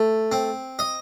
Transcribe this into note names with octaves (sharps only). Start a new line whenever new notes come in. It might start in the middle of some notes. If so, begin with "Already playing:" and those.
Already playing: A3
C4
D#5